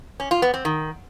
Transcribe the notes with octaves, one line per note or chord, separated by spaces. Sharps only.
C#4
F4
B3
C4
D#3